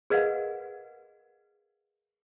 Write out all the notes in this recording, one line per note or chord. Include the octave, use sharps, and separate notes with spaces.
G#4 A#4 B4 D#5 F5 F#5